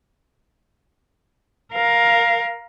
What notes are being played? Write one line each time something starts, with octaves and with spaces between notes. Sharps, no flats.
A#4 F5